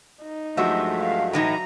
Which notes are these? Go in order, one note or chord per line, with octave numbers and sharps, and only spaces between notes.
D#4
G2 F3 F#3 G#3 A3 F#4 E5
F5
A2 E3 D#4 A#5